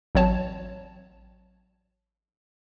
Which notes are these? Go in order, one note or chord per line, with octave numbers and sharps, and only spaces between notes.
A1 F#3 C4 C#5 A5